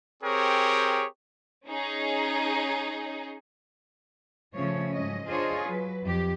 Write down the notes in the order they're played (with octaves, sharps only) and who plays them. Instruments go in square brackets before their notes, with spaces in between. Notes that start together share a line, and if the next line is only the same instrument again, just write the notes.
[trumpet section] C4 G4 G#4 A#4 C#5 G5
[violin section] C#4 D#4 G#4
[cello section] C#3 F3 A3 C#4 C#5
G#2 F#3 C#4 D#5
D4 F4 G#4 C5 C#5 D#5
F#3 B4
F2 G4